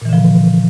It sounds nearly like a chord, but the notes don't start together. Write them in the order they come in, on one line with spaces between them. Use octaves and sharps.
A#2 E3 D3 F3